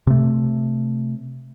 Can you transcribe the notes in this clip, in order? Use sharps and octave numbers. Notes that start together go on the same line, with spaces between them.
C3 A3